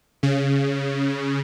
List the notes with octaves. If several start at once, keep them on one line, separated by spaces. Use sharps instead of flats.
C#3